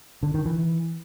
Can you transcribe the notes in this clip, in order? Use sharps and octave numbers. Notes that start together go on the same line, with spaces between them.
D3
D#3
E3